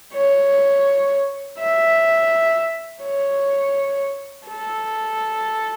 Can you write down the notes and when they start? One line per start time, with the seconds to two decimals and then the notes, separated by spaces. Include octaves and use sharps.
0.13 C#5
1.59 E5
3.03 C#5
4.48 A4